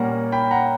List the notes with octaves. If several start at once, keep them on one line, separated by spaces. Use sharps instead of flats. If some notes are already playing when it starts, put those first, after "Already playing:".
Already playing: A#2 G3 A#3 C#4 F#5 A#5
G5 B5
F#5 A#5